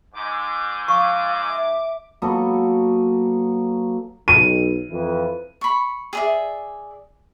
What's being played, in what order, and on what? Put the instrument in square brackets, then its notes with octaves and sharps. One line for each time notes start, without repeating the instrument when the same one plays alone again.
[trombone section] G#2 [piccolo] D6
[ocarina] F5 [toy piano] C#6 [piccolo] D6
[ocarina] E5
[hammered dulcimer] F#3 A#3 B3 A4
[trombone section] B1 [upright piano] D#7
[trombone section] F2 E3 B4
[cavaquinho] B5 C#6
G#4 D5 E5